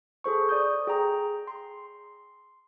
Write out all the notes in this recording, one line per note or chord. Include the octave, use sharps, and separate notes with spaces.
G#4 A4 C5 C#6
D5 D#6 G6
G#4 G5 A#5
C6